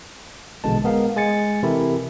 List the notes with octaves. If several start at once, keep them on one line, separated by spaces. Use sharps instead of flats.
A#1 B2 D3 E3 G#3 A5
G#3 B3 A#4 F5
G#3 G#5 A6 C#7
C3 E3 E4 G4 A4 A#4